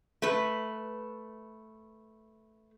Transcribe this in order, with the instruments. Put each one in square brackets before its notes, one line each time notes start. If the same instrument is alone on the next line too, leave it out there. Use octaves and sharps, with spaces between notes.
[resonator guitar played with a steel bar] A3 B4